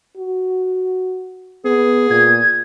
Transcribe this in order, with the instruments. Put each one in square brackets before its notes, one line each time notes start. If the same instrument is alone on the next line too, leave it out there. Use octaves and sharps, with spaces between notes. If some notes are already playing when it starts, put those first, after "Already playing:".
[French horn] F#4
[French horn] B3 [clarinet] G#4
[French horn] A#2 [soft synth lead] G#6